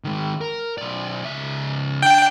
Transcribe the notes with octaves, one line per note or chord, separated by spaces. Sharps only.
D#3 G#3
A#4
B1 D5
C#2 E5
D4 G5